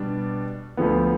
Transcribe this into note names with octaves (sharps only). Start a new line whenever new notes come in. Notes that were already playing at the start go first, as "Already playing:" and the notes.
Already playing: B2 G3 D4
D2 D3 F3 B3